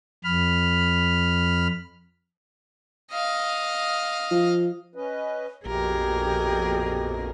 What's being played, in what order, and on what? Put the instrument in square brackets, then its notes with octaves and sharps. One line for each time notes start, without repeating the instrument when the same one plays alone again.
[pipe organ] F2 B5 F6
[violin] D#5 F5
[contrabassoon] F3
[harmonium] C#4 B4 D#5
[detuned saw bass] A#1 [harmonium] F2 B2 [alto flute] G4 [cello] G#4 A#4